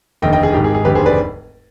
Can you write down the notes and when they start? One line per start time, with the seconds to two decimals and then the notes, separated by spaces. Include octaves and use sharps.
0.22 F1 D#2 D3 D#5 G5
0.33 D#5 G5
0.43 G#4
0.53 G#1 G#2 D#3 G4
0.64 G#4
0.74 G#4
0.85 F1 D#2 D3 G4 B4
0.95 G#4 C5
1.06 B4 D5